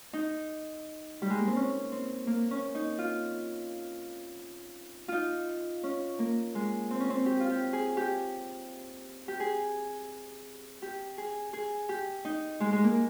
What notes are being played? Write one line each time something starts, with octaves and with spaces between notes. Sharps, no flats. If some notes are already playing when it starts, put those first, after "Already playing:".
D#4
G3
G#3
A#3
C4
C#4
C4
A#3
C#4
D#4
F4
D#4 F4
C#4
A#3
G#3
C4
C#4
C4
G4
F4
G4
G#4
G4
G4
G#4
G4
G#4
G#4
G4
D#4
G#3
G#3
A#3